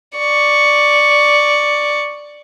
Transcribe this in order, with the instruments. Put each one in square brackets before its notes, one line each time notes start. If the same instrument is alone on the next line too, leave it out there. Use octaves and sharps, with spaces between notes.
[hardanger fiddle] D5 C#6